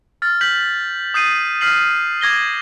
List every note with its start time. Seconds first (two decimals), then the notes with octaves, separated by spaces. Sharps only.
0.22 F6 A6
0.41 G6 B6 F#7
1.14 D#6 G6 C7 D#7
1.61 F6 B6 C7 F#7
2.21 D6 G#6 A#6 G7